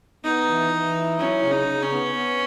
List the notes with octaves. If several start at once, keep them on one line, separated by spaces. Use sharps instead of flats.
B3 D#4
E3
E3
E4
F#3 C#4
C#3
D#4
C#3
C#4
B3
B3